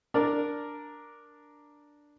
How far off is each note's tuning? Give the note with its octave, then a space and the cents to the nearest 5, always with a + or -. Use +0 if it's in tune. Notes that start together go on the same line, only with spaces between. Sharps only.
D4 +0 A#4 +0 D5 +0